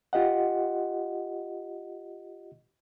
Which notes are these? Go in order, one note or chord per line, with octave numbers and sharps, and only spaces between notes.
F4 G4 D#5 F#5